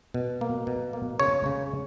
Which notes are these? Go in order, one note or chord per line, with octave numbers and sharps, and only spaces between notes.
B2
A#3
B2
A#3
C#3 C#5
C#3